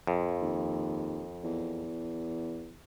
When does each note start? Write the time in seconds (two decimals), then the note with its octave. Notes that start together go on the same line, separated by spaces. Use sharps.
0.07 F2
0.42 D#2
1.44 E2